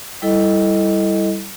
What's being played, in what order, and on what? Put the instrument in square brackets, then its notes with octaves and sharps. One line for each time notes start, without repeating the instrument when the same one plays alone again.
[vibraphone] G3 E4 A4 D#5